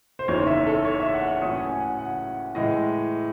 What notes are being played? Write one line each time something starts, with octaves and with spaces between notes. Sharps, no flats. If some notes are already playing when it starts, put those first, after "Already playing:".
C5
F#1 E2 D#3 C#5
E5
A4
C#5
E5
F#5
F#5
A2 F#3 A3 C#4 D#6
G#5
F#5
F#5
A2 E3 G#3 D#5